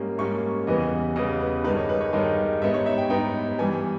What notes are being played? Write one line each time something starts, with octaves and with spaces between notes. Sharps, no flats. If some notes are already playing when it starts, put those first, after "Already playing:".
Already playing: G#2 G3 A#3 C#4
G#2 G3 A#3 C#4 C#6
E2 C#3 E3 G3 B3 D#5
E2 C#3 E3 G3 B3 D#5
B4
G2 D#3 G#3 D#4 B4
C#5
B4
C#5
G2 D#3 G#3 D#4 D#5
G#2 G3 B3 D#4 E5
C#5
E5
G5
G#2 G3 B3 D#4 G5
G2 E3 G3 B3 G#5